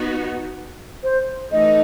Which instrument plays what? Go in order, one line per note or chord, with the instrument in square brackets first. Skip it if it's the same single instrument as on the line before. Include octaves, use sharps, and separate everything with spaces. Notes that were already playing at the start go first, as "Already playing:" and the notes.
Already playing: [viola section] B3 D#4 F#4
[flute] C5
[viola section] E3 A3 D#4 [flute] D#5